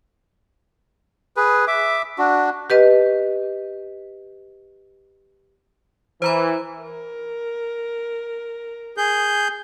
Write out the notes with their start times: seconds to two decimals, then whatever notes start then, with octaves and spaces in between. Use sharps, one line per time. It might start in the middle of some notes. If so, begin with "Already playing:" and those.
1.37 G#4 B4
1.68 E5 D6
2.18 D4 F#4
2.70 G4 B4 D#5
6.22 E3 C5 A#5 B5
6.82 A#4
8.98 G#4 G6